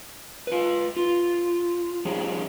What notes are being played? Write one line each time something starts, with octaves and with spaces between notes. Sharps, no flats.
F4 B4
F4
F3 G3 C#4 G#4